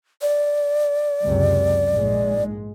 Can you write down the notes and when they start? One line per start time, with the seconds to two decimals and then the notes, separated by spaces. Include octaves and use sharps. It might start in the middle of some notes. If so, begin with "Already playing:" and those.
0.22 D5
1.24 C#2 F#2 C3
1.93 A#1 G#2 G#3